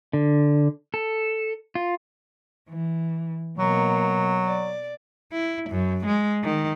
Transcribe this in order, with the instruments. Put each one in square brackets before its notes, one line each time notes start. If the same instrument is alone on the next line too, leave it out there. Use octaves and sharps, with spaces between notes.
[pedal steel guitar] D3
A4
F4
[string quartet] E3
[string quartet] B2 A#3 [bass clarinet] F#3
[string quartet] D5
[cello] E4
F#2
G#3
D#3